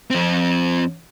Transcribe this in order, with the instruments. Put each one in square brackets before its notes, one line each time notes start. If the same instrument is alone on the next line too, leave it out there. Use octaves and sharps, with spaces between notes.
[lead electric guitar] F2 C4